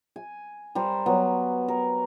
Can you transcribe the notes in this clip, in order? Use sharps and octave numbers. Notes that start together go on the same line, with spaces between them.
G#5
G3 A#4 C5
F#3 B3
A#4